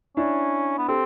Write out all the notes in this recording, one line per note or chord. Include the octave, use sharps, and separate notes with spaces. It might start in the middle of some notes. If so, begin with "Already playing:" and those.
C#4 D4 E4
B3
C4 G4 A4